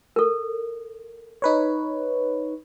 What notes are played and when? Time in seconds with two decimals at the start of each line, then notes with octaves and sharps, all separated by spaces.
0.16 A4 A#4
1.42 D#4 B4 C#5